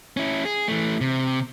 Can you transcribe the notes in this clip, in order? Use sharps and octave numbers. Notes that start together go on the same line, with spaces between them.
C#4 E4
G#4
E3 A3
C3